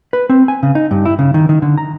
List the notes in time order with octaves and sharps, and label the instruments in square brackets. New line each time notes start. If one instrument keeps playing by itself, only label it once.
[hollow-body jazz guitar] B4
C4
G#5
C#3
D#4
G2
E4
C#3
D#3
D#3
D3
A#5